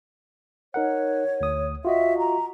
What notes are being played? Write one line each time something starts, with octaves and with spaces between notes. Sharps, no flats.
D#4 A#4 C#5 F#5
D2 D#6
F4 F#4 D#5 E5
A#5